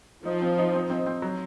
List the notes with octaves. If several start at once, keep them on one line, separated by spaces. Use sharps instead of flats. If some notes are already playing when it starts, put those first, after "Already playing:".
F3 D#4
C4
D#4
C4
C4
C4
F#3